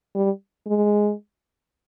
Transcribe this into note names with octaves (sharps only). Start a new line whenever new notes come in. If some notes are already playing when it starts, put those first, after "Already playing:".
G3
G#3